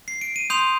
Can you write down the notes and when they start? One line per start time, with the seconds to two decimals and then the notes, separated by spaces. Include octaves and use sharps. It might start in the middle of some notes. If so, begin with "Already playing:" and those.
0.08 C7
0.21 D7
0.36 D#7
0.50 C6 D#6 G6 F7